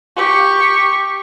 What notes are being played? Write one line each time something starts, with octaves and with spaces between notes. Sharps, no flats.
G4 C#6